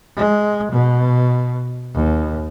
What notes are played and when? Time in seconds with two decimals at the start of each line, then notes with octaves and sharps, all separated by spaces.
0.17 G#3
0.72 B2
1.94 D#2